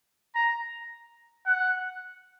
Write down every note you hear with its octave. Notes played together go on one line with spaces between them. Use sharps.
A#5
F#5